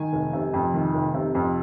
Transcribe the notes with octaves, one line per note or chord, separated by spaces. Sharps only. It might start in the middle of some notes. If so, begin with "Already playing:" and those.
Already playing: D#3 G#5
F1
C3
F2
D#3
F1
C3
F2